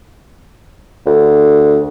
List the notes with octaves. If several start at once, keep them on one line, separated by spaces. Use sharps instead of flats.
D2